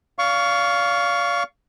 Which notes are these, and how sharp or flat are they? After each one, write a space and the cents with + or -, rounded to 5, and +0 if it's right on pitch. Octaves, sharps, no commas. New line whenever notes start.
D5 -35 F5 +0 C#6 +15